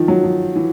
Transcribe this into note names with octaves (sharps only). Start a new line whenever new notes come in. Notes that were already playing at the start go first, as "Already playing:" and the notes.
Already playing: D#3 F3
F#3
F3
E3